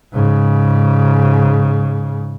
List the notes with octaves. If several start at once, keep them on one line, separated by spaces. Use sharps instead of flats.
G#2 C#3